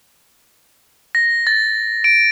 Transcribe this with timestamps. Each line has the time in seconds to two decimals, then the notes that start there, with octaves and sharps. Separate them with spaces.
1.15 A#6
1.47 A6
2.04 D7